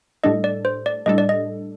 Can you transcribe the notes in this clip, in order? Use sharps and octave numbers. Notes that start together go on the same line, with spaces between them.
A2 G3 D4 A4 D#5
D5
C5
D5
A2 G3 D4 A4 D#5
D5
D#5